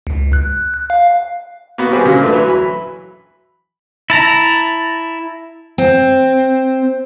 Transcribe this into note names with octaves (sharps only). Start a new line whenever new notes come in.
C#2
F#6
F5
A#3 B3 F#4
E3 G3 C4 F#4 G#4 B4
A#2 C#3 G#3 A#3
D3 A3 B4
E3 F#3 B4 E5
B5
E4 A5 A#5
C4